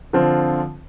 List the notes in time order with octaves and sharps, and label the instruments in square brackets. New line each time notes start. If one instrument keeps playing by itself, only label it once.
[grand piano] D3 F3 C4 F4